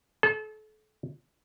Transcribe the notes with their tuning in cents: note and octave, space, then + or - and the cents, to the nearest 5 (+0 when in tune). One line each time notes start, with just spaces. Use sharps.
A4 -35